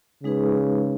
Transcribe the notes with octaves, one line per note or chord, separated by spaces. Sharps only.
C#3 G#3 D#4 G#4 B4